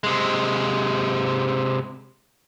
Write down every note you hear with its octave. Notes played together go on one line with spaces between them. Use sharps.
C3 G#3